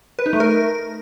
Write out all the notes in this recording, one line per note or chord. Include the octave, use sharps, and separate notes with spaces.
B4
D#4
A3
A#4